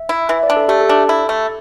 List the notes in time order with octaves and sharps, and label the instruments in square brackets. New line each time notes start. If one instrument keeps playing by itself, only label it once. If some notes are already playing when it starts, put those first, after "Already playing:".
Already playing: [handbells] E5
[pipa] E4
[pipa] E3 [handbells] E5
[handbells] D5
[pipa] D4
[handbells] A4
[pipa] A3 [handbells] G4
[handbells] A4
[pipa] D4
E4
A3